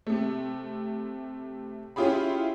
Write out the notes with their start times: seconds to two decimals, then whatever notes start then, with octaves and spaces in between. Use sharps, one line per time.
0.07 C3 A3
1.96 C#4 E4 F4 G4 G#4 B5